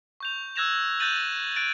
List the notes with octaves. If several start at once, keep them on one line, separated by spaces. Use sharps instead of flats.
C#6 G6 F7
E6 F#6 G#6 A#6 E7 F7
F#6 G6 A6 A#6 D#7 F#7
F#6 A6 D7